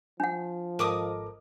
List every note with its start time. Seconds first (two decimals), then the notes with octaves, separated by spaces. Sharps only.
0.20 F3 D4 F#5
0.79 G#1 A4 A#4 D#5 D6 D#6